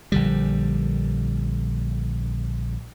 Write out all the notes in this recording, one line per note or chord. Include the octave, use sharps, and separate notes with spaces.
A#1 D3 G3